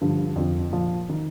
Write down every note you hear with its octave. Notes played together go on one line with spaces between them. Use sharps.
G2 D3 F3
F2 D3 F3
A#2 F3
D#3